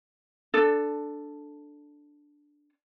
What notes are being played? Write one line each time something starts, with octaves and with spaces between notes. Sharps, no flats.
D4 A4